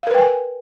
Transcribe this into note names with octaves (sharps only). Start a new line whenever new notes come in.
A#4 B4 F5 G5 G#5